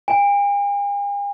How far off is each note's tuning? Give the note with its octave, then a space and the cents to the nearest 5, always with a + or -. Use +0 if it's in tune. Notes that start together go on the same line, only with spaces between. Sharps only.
G#5 -45